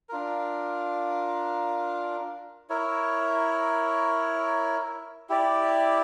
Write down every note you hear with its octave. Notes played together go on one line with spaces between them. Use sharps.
D4 F4 A#4
E4 A#4 C#5
E4 G4 D5